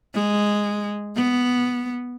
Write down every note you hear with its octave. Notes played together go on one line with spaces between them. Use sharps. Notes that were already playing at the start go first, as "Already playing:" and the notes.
G#3
B3